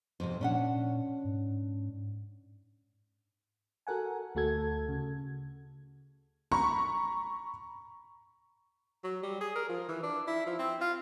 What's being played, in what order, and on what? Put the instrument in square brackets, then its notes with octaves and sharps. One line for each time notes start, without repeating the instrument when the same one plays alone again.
[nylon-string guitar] F2 C3
[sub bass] A#2 [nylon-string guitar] C#4 D4 F#5
[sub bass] G#2
[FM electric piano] F#4 A4 A#4 F#5 G#5
D2 A3 F#4 A4 G#6
C#3
[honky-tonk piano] A#5 B5 C#6
[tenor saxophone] F#3
G3
G#4
A#4
F3
E3
D4
E4
F3
C4
F4